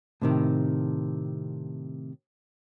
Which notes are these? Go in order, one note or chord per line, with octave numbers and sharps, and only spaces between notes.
A2 C3 D#3